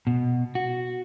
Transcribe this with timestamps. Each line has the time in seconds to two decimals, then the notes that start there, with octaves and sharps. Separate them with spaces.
0.07 B2
0.55 F#4